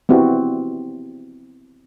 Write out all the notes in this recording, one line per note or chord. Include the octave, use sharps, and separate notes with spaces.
B3 C4 E4 F#4 G4